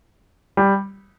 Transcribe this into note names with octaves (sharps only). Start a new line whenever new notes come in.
G3